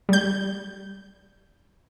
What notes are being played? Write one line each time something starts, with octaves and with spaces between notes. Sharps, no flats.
G3 G6